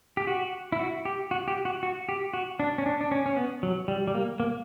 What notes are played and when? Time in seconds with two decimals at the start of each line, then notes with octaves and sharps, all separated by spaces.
0.17 G4
0.27 F#4
0.72 E4
0.79 F#4
1.05 G4
1.31 F#4
1.48 G4
1.65 F#4
1.83 F#4
2.09 G4
2.34 F#4
2.60 D4
2.78 C#4
2.86 D4
3.01 D4
3.11 C#4
3.26 C#4
3.36 B3
3.63 F#3
3.88 G3
4.08 G3
4.15 A#3
4.40 A#3